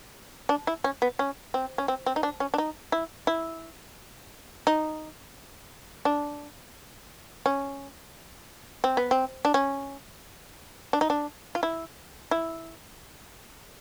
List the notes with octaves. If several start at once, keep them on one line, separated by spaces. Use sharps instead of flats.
D4
E4
C#4
B3
C#4
C4
C#4
C4
C4
D#4
D4
C#4
D4
D#4
E4
E4
D#4
D4
C#4
C4
B3
C4
D4
C#4
D4
D#4
D4
F4
E4
E4